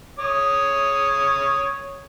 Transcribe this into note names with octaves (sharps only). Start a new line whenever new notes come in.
C#5 D#6